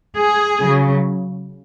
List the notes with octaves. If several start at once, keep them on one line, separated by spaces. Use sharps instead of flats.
G#4
C#3 F#3